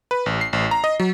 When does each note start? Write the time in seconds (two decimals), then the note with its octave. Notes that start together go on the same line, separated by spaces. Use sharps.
0.11 B4
0.26 A1
0.41 C7
0.53 A1
0.71 A#5
0.84 D#5
1.00 F#3